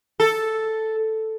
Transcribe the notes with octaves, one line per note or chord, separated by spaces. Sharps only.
A4